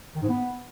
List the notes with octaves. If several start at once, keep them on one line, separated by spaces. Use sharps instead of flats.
D#3
G#2
B3